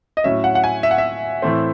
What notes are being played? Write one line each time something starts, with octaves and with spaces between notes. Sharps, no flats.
D#5
A2 F#3 C#4 E5
F#5
F#5
G#5
E5
F#5
E5
A2 E3 A3 C4